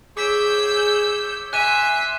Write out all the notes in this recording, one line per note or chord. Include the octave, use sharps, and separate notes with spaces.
G#4 C#5 D6 E6 G6 B6 D7
E5 G#5 C6 F#6 D#7 E7